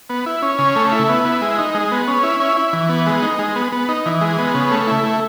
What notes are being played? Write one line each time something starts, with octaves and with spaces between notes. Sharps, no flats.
B3
E4
C#4
C#3
A3
E4
B3
E4
G#3
D#4
G#3
B3
C#4
E4
C#4
E4
E3
B3
G#3
D#4
G#3
B3
B3
D#4
E3
G#3
B3
C#3
A3
E4
A3